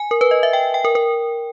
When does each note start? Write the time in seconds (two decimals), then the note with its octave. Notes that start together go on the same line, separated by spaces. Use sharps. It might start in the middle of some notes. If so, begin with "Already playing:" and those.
Already playing: G#5
0.11 A#4
0.21 B4
0.31 D#5
0.43 E5
0.53 G5
0.74 G5
0.85 A#4
0.95 A#4